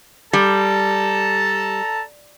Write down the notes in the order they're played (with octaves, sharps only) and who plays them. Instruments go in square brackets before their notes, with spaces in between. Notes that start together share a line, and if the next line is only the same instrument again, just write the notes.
[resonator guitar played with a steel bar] G3 [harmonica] A4 A5 A#5